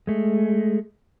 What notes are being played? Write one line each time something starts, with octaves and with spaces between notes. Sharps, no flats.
G#3 A3